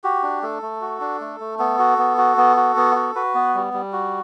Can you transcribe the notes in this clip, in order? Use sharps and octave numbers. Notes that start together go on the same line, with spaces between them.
F#4 G4
D4
A3 A4
A3
F#4
D4
A3
A3
B3 A4
F#4
B3
F#4
B3
F#4
B3
F#4
F#4 B4
B3
G3
G3
F#4